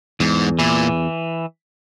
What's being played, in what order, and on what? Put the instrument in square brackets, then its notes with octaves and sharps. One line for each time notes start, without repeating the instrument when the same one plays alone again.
[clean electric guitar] E2 [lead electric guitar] G#2
[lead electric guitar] A#2 [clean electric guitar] E3